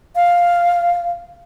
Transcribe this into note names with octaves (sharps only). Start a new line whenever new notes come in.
F5